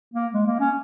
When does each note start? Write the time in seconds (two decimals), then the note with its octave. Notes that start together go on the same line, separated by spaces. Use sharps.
0.14 A#3
0.33 G#3
0.47 A#3
0.60 C#4